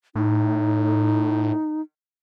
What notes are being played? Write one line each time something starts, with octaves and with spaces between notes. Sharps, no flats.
A2 D#4